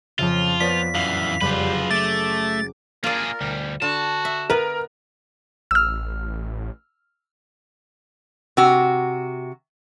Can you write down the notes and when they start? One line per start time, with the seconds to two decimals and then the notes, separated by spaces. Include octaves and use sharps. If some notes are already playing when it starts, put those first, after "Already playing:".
0.19 F2 C#3 F3 F4 E5
0.60 F3 B3 D5 B6
0.95 F#2 E3 F5
1.41 F#1 F2 G3 F4 G4 B4
1.91 A3 D6 A6
3.04 A#3 F4 G#4 A#4 D5
3.41 D2 G3
3.82 D3 F#4 A5
4.25 E5
4.50 B3 A#4 B4
5.71 A1 E6 F6
8.57 C3 F#4